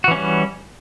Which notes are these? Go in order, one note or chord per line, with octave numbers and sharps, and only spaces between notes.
E3 G3 C#4 F#4